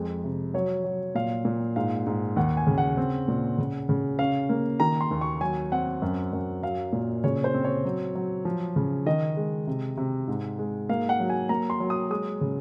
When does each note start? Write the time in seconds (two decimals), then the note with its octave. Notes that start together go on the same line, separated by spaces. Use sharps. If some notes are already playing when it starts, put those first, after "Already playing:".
Already playing: F2 G#3
0.24 C3
0.54 F#3 C#5
0.84 F#3
1.15 A#2 F5
1.45 A#2
1.76 G#2 F5
2.07 G#2
2.36 D#2 F#5
2.57 G#5
2.67 C#3
2.78 F#5
2.97 C4
3.28 A#2
3.58 C#3
3.89 C#3
4.19 C#4 F5
4.49 A#3
4.80 D#3 A#5
5.01 C6
5.11 D#2
5.21 C#6
5.41 F#3 G#5
5.72 C4 F#5
6.02 F#2
6.33 F#2
6.63 F#3 F5
6.93 A#2
7.24 C#3 C#5
7.44 C5
7.54 C4
7.64 C#5
7.85 F#3
8.15 F#3
8.45 F3
8.76 C#3
9.06 D#3 D#5
9.37 G#3
9.67 C3
9.97 C3
10.28 G#2
10.59 G#3
10.89 A#3 F5
11.09 F#5
11.20 F#3
11.29 G#5
11.49 A#3 A#5
11.70 C6
11.80 F#3
11.90 D#6
12.10 G#3 D#6
12.41 C#3